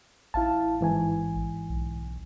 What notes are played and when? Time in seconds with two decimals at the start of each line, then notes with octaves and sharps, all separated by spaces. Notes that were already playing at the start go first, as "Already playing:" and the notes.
0.34 A1 E4 F5 A5
0.81 G#2 E3 G#5
1.69 B1